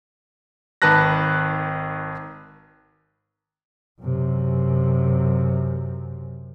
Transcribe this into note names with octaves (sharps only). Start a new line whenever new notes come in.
G#1 D#3 B4 A5 F#6 A#6
F#2 C3